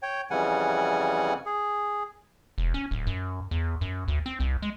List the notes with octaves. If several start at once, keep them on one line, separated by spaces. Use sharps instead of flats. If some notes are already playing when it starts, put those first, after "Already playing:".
C#5 G5
F2 C#3 E3 G3 F#5 G#5
G#4
E1
C#4
D1
F#2
E2
F#2
D2
C4
C2
G#3